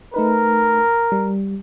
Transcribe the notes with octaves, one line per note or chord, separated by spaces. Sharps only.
A3 D#4 A#4 B4
G3